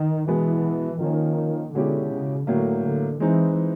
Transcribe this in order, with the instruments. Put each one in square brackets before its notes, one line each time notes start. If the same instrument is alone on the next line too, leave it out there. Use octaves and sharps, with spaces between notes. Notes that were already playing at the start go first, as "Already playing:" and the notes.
Already playing: [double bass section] D#3
[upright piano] B2 G#3 B3 [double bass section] E3
[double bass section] D#3 [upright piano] F3 A#3 C#4
[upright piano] B2 G#3 C#4 E4 G4 [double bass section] D3
[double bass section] C#3
[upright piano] A2 F#3 A#3 [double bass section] D3
[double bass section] D3
[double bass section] E3 [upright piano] G#3 C4 D#4